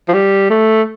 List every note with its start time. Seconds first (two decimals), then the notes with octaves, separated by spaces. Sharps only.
0.08 F3
0.13 G3
0.50 A3